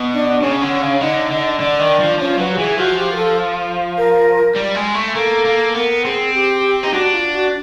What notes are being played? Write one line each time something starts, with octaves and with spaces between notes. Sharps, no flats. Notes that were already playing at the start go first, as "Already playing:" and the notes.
Already playing: B2
D4 D5
C#3 C#4 C#5
D3
C#3
D3 D#4 D#5
D3
D3 D4 D5
D#3
F3
F3 C#4 C#5
F#3 B4
G4
E3 G#4
F3 F#4
G4
A#4
A4
A#4
G3
G#3
A3
A#3 A4
A#3
B3 A#4
C4 G#4
G4
D#4
D4 F#4
F4
F#4